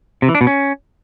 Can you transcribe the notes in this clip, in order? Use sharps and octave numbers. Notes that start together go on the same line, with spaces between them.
C3
E3
D4
B2
C#4